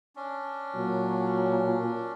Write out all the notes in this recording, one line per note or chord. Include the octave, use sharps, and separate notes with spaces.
C#4 D4
A#2 F#3